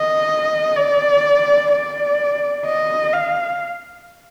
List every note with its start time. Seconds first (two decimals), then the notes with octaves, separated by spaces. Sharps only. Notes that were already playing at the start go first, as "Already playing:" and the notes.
Already playing: D#5
0.76 D5
1.72 D5
2.66 D#5
3.13 F5